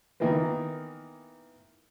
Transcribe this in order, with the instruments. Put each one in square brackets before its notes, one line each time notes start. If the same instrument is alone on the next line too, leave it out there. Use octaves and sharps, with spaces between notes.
[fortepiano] D#3 E3 A#3 B3